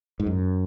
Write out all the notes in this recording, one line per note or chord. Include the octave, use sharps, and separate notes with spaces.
G#2
F#2